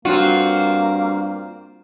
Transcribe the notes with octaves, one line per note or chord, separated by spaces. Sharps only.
G2 A#3 C4 F4 F#4